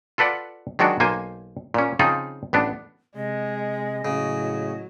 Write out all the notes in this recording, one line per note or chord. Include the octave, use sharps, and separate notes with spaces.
F4 A4 B4 D5 F#5
D#3 F#3 G#3 D4 F#4
B1 A#3 C5 G#5
A#2 C#4
C#3 F3 C4 D#4 F4 G#4
A1 B3 D4
C3 G#3 D#5
A2 C#3 F#3